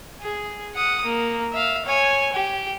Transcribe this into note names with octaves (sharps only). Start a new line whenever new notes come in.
G#4
F#5 D#6
A#3
E5 F5
C#5 G#5
G4